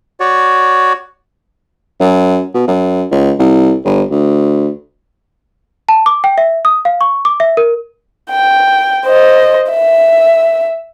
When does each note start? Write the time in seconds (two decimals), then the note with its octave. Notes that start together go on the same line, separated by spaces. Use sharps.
0.20 F#4 C#5 D5
2.01 F#2
2.54 B2
2.68 F#2
3.12 C#2
3.40 C2
3.85 G1
4.11 D2
5.89 A5
6.06 D6
6.24 G5
6.38 E5
6.65 D#6
6.85 F5
7.01 C#6
7.25 D6
7.40 E5
7.57 A#4
8.30 G5
9.05 C5 D#5
9.70 E5